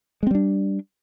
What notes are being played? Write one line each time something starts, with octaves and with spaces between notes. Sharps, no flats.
G3 G#3 C4 D4